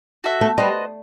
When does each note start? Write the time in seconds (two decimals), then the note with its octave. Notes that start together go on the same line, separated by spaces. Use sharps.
0.24 F#4 A4 E5
0.41 A3
0.58 G3 B3 F#4 C5 D#5